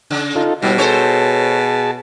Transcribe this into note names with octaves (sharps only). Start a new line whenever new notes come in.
C#3
D#4 F4 A4
G#2 B2 G3
G#4 A4 C5 C#5 A5